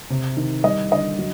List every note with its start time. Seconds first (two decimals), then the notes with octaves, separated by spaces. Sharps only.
0.10 C3
0.37 D#3
0.64 G3 D#5
0.92 D3 D#5
1.18 F#3